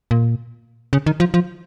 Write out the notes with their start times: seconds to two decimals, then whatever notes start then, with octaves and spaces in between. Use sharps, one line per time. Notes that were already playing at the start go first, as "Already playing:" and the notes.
0.11 A#2
0.93 C#3
1.06 D#3
1.20 F3
1.34 F3